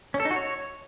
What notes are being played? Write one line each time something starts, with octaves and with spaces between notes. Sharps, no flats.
C#4
A4
D#4
F#4
C#5